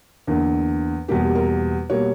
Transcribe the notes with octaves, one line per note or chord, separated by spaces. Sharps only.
E2 D3 A#3
E2 B2 G3 A#3 G4
A#4
B2 G3 A#3 C#5